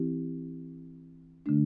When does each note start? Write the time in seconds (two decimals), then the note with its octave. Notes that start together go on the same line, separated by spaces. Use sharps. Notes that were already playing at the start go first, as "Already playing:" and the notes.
Already playing: E3 C4 E4 G4
1.46 D3 A3 D4